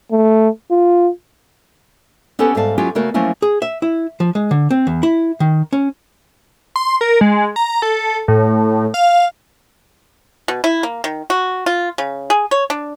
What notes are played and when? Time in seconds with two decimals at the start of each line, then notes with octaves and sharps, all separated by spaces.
0.12 A3
0.71 F4
2.39 B3 C#4 G4 A4 C5 F#5
2.55 G#2 G3 E5 F5 A5
2.78 F#3 C#4 E4 F4 G4 G#4
2.95 C#3 A3 A#3 F#4 A#4
3.14 F3 F#3 A3 A#3 C#4 E4
3.42 G#4
3.62 E5
3.82 E4
4.20 F3
4.35 G#3
4.51 D3
4.71 C4
4.87 E2
5.03 E4
5.40 D#3
5.73 C#4
6.76 C6
7.01 A#4
7.21 G#3
7.56 A#5
7.82 A4
8.28 A2
8.94 F5
10.48 B2
10.64 E4
10.83 A#3
11.04 D#3
11.30 F#4
11.66 F4
11.98 C#3
12.30 G#4
12.51 C#5
12.70 D4